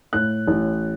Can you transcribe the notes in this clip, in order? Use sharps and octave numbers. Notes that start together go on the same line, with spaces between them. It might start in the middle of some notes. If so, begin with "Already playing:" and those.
A2 F#6
A1